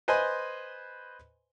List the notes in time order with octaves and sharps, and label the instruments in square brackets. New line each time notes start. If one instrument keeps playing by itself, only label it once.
[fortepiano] B4 C5 D#5 G#5 C6